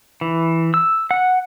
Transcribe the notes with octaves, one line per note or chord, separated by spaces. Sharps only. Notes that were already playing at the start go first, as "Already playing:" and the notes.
E3
E6
F#5